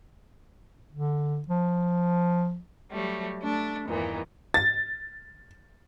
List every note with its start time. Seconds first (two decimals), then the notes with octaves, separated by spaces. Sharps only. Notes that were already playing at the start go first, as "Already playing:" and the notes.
0.92 D3
1.48 F3
2.91 F#3 G3 A3
3.42 A3 D4
3.87 E2 G2 A#2 D#3 E3
4.54 A6